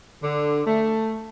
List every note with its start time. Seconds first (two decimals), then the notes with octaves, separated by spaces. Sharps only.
0.23 D3
0.67 A3